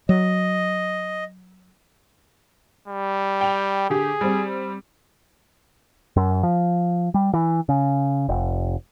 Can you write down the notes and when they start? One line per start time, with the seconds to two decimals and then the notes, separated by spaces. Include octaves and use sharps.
0.09 F#3 D#5
2.88 G3
3.41 G5 F7
3.90 D3 G4 G#4
4.21 G3 C4
6.16 F#2
6.43 F3
7.14 G3
7.34 E3
7.69 C#3
8.29 F1